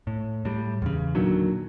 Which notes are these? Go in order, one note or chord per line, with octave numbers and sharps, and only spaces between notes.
A2
A2 G3
E2 C#3
A#2 D3 D#3 F#3